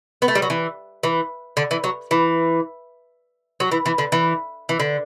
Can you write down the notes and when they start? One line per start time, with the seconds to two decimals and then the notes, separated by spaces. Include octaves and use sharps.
0.22 B3
0.28 A3
0.35 G3
0.42 F#3
0.50 E3
1.03 E3
1.57 D3
1.71 E3
1.84 F#3
2.11 E3
3.60 F#3
3.71 E3
3.86 E3
3.98 D3
4.12 E3
4.69 E3
4.80 D3